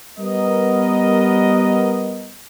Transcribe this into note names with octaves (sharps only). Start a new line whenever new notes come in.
G3 B3 A#4 D#5